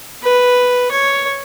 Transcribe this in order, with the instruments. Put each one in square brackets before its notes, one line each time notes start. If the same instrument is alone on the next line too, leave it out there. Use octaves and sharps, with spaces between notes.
[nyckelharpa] B4
C#5